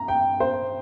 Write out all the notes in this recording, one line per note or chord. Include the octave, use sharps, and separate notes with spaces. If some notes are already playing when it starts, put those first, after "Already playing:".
Already playing: A#5
G5
C5